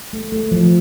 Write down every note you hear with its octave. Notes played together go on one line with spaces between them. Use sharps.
A3
A3
F3